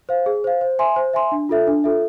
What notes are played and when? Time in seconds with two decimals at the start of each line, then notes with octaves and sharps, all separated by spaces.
0.09 C5 F5
0.26 G#4
0.44 C5 F5
0.61 C5
0.79 E5 G#5 C6
0.96 C5
1.13 E5 G#5 C6
1.32 D4
1.49 F4 A4 E5
1.67 D4
1.84 F4 A4 E5